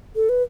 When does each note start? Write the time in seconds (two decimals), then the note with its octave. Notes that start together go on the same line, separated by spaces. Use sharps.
0.16 A4
0.29 B4